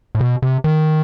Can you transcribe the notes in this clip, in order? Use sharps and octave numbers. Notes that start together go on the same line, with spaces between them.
A2
B2
C3
D#3